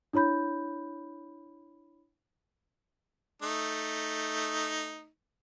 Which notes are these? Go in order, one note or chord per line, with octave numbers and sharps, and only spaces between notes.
D4 E4 C#5 B5 G6
A3 D#4